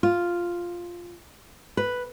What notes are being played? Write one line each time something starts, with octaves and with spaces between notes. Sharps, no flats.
F4
B4